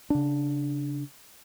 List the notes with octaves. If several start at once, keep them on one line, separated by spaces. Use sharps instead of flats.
C#3 D4